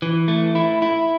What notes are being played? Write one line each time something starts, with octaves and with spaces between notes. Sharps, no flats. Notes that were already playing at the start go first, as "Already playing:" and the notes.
E3
A3
E4
E4